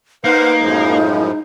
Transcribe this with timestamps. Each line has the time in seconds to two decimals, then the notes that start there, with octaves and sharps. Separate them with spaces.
0.24 A#3 D#4 B4 C5 F5 F#5
0.62 F#2 A2 F3 G#3